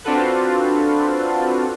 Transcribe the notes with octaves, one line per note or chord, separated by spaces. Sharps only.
C4 D4 F4 F#4 A4 B4